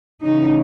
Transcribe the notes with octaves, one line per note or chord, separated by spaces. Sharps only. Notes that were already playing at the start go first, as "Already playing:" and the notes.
C#3 E3 A3 C#4 D#4